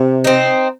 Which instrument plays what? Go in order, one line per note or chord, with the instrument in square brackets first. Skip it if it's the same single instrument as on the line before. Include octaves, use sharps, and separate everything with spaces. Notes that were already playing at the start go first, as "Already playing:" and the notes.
Already playing: [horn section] C3
[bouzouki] C4 D#4